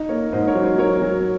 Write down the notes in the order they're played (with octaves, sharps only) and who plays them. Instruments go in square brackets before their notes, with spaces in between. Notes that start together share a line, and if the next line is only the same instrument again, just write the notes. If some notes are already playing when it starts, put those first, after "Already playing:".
Already playing: [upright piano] D#4
[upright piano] A#3 [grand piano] A#4 C#5
[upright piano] G#2 [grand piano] C5 D#5
[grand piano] A#4 C#5
[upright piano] F#3
[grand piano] C5 D#5
[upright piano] F#3 [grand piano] A#4 C#5
[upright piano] F#3